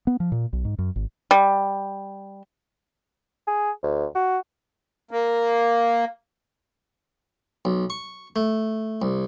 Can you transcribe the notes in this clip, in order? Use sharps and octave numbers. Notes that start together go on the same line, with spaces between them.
B3
F3
A#2
B1
G#2
F#2
G#1
G3
G#4
D2
F#4
A#3
B1
C#6
A3
C2